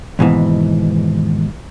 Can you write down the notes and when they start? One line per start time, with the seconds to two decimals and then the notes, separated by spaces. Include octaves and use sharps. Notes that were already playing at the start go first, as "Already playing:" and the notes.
0.19 D#2 G#2 B2 E3